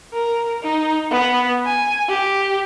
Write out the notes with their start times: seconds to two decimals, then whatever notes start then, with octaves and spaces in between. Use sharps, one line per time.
0.13 A#4
0.63 D#4
1.11 B3
1.66 G#5
2.09 G4